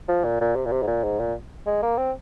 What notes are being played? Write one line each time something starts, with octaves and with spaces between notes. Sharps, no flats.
F3
A#2
A#2
C3
A#2
C3
G#2
A#2
G#2
A#2
G#3
A#3
C4